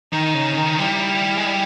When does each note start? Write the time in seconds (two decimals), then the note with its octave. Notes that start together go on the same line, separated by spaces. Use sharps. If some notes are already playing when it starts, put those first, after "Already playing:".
0.12 D#3 D#4
0.34 C#3
0.53 C#3
0.58 D#3
0.79 G3 E4
1.38 G#3
1.46 G3